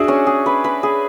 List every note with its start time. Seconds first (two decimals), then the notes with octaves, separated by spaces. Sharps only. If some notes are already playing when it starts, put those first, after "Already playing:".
Already playing: D4 F#4 G#4 E5
0.08 C#4
0.27 G#4
0.46 B4
0.64 B4
0.83 G#4